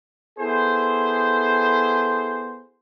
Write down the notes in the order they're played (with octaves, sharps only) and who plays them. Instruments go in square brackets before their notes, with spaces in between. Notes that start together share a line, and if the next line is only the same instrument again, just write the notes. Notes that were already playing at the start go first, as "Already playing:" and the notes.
[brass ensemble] B3 E4 G#4 A4 C5